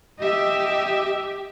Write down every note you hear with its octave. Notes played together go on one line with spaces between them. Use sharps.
G4 D#5 E5